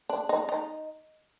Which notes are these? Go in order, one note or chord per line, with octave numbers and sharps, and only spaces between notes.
D4
D#4
D#4